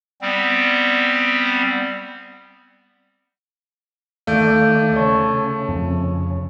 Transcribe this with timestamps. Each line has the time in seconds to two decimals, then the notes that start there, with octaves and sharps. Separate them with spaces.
0.22 G3 B3 C4
4.27 D#2 A3 D5 F5 G6 D7
4.96 C#3 C#5 A5 C#6
5.29 C#3
5.69 F2